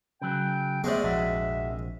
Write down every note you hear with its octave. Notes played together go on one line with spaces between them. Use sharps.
C#3 F#3 G5
C3 G#3 A3 B3 G4 D5
A#1 F2 F#4 E5